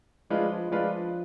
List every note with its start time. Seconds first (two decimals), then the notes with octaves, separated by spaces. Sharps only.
0.30 F3 G#3 D4 F4 B4
0.50 F3
0.71 F3 G#3 D4 F4 B4